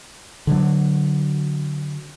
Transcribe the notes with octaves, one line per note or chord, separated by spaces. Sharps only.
D3 F#3